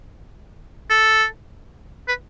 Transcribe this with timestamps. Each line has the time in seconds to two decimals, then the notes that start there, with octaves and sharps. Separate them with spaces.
0.90 A4
2.08 B4